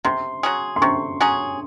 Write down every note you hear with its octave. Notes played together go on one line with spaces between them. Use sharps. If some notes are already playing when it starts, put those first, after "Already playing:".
C3 C6
F#3 C#4 G#4
C6
C3 C#6
F#3 C#4 G#4